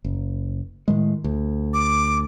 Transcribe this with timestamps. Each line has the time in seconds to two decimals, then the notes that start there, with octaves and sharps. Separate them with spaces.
0.04 F#1
0.88 A2 D#3 G#3
1.24 D2
1.74 D6